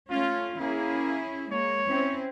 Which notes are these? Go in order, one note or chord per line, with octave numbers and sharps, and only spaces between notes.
A3 C#4 F4
A#3 C#4 E4 G#4
G#3 A#3 C#5
C4 C#4 E4